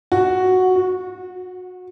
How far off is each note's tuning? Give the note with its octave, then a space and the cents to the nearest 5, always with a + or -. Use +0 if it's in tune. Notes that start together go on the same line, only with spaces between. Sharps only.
F#4 +0
F#4 -25